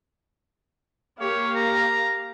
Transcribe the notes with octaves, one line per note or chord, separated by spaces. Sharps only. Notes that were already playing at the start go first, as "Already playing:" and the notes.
A#3 G4 C#5 F5
A#5